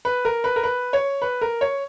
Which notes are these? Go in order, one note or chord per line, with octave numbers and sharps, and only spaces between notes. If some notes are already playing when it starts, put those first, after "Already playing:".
B4
A#4
B4
A#4
B4
C#5
B4
A#4
C#5